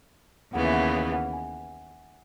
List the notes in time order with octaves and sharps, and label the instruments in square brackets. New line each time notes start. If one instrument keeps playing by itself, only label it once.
[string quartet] D#2 C#3 E3 B3 [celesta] F#5
[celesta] E5
F#5
F#5
F#5
G#5